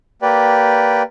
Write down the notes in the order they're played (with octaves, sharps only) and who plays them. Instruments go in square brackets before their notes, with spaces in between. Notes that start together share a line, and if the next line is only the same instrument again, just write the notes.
[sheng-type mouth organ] A#3 G4 B4 D5 G5